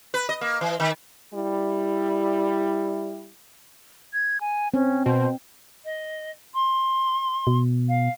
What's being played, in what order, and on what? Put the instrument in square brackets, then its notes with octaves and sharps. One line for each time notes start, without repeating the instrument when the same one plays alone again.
[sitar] B4
D#5
A#3
E3
D#3
[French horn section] G3 E4
[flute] G#6
G#5
[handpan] C4 [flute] C#4
[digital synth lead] B2 [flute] C5
[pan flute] D#5
C6
[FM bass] B2
[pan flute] F5